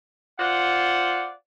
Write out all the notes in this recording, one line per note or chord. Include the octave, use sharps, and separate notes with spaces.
F4 C5 D5 F#5